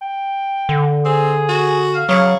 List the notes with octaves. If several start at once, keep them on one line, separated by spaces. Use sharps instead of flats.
G5
D3
C4 G#4
F#4
F5
C#3 F#3